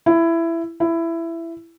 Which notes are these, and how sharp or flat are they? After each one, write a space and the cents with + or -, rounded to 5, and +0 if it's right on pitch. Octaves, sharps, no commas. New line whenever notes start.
E4 +15
E4 +15